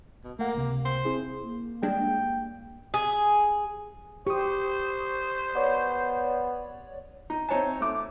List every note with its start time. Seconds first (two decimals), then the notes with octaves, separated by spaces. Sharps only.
0.24 B2
0.39 A3 A#3 F#5
0.55 C#2 C3
0.85 C5
1.05 C4 E4 G#4
1.43 A#3
1.83 G3 G#3 D4 G5
2.94 G#4
4.27 G4 C5 C#6 D#6
5.55 B3 C#5 D5
7.30 D#4
7.49 C4 D#4 C#5 G#5 A5
7.81 A3 D6